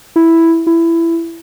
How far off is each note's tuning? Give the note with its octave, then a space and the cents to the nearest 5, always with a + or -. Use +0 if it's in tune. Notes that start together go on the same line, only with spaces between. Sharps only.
E4 +0
E4 +15